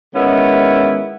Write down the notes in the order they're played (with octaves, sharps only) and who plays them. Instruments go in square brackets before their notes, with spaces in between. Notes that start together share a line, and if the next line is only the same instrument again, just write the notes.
[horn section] D#3 G#3 B3 C#4 E4